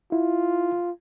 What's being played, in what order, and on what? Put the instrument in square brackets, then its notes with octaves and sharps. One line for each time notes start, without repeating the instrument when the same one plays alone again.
[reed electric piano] E4 [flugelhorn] F4